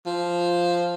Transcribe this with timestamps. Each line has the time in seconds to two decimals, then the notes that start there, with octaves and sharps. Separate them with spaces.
0.06 F3